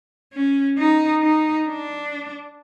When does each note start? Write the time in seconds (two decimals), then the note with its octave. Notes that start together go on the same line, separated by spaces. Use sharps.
0.33 C#4
0.78 D#4
1.22 D#4
1.68 D4